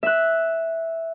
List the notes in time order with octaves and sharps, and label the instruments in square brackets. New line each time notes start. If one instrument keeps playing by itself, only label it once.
[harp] E5 F#6